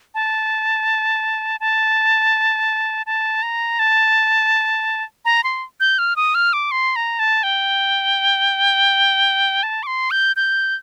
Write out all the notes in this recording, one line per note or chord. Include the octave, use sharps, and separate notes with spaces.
A5
A5
A5
A#5
A5
A#5
C6
G6
F6
D#6
F6
D6
C6
A#5
A5
G5
A5
D6
C6
G6
G6